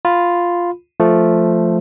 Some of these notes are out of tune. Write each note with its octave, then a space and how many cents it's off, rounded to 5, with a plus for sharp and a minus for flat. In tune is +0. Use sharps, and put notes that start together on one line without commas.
F4 +0 B5 +10
F3 +0 A3 +0